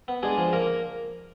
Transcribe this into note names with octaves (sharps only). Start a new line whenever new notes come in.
B3
G#3 D4 G#4
F3
A#3 A#4